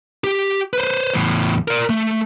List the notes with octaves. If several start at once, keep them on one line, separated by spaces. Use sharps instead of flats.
G4
B4 C5
E2 A2
A#4 D5
A3